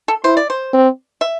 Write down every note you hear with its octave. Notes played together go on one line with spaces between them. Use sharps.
A4
E4 C5
D5
C5
C4
E5